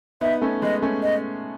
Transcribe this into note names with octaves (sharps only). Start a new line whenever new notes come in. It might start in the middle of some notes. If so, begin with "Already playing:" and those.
B3 D#4 E5
A3 C#4
G#3 B3 D#5
A3 C#4
D#5